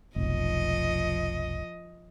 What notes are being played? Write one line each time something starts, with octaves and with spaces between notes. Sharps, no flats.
F1 B1 F3 D#5